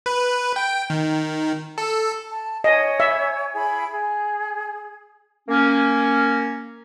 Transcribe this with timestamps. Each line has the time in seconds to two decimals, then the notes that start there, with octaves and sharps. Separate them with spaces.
0.06 B4
0.56 G5
0.90 D#3
1.78 A4
2.29 A5
2.64 C#5 D#5 G#5
3.00 E5
3.54 E4 G#4 B5
3.91 G#4
5.48 A#3 C#4